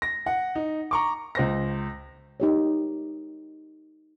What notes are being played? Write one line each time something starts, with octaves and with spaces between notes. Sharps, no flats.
A#6
F#5
D#4
A#5 C#6 D6
C#2 C5 A#6
D#4 G4 C#5